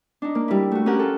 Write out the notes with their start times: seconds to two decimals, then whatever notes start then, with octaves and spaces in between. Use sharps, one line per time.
0.22 D4 D#4
0.35 A#3
0.48 G3 E4
0.72 A3 F#4
0.86 C#4 G4 A#4 F#5
0.99 F4 A4